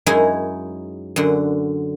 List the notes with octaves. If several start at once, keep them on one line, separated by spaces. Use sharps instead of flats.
F#2 G#3 D#4 E4 G#4 E5
F#2 D3